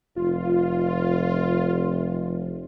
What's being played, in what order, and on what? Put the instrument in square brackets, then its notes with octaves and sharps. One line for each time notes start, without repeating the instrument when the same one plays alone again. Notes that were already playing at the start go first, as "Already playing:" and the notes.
[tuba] F1 [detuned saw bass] F4